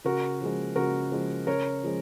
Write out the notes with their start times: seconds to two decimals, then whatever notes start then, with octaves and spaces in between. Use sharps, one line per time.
0.04 C#3 F#4 A#4
0.41 F3 G#3
0.76 C#3 F#4 A#4
1.12 F3 G#3
1.47 C#3 A#4 C#5
1.83 F3 G#3